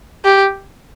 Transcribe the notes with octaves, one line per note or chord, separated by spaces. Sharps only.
G4